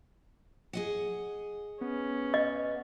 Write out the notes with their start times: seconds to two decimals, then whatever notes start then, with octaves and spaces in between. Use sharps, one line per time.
0.73 G#4 D#5 F#5
1.81 B3 C#4
2.34 D#5